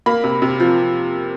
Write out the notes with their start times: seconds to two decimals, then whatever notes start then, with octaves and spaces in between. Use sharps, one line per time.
0.06 A#3 B5
0.24 C3
0.42 C3
0.60 F3